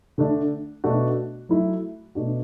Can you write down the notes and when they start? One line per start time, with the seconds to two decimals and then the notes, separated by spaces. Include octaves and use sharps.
0.18 D3 A3 D4
0.84 B2 A3 D4 F#4
1.49 F#3 A3 E4
2.15 B2 A3 D4 F#4